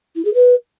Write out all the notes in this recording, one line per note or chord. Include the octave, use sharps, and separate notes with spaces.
E4
G#4
B4